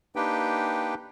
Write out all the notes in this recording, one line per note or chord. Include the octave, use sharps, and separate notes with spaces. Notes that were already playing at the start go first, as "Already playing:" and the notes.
A#3 D4 D#4 G4 B4 G5